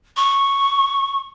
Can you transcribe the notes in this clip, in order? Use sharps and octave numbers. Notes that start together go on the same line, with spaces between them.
C#6